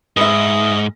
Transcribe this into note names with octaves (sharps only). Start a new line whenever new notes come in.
G#2 B4 D#5 E5 D#6